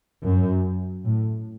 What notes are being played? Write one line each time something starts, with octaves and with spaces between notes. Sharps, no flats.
F#2
A2